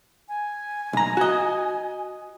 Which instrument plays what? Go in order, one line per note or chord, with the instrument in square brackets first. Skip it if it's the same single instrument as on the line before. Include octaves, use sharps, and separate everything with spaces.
[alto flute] G#5
[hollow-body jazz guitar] B1 A#5
F#4 D#5